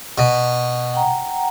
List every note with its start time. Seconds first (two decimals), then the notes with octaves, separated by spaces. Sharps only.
0.18 B2
0.94 F#5 G5 A#5